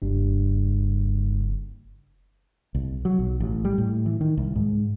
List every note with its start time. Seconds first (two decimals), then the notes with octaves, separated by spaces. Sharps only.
0.02 F#1 G2 G3
2.75 C2
3.05 F#3
3.19 B1
3.40 A1
3.65 G3
3.78 A2
4.06 E3
4.21 D#3
4.37 C2
4.55 G#2